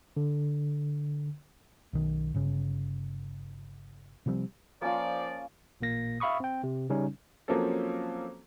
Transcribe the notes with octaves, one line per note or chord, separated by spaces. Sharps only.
D3
B1 D#3
G1 C#3
C3 F3 G3 C4
F3 A#3 C#4 F4 D5
A1 A#2 A#3 A#6
E5 F5 B5 C#6 D#6
C4 G5
C3
C#3 G3 C#4 D#4
F3 F#3 A#3 C4 C#4 A4